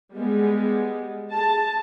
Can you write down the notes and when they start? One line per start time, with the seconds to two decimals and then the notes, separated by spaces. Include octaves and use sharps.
0.12 G3 G#3 B3 G#4
1.33 G#4 A5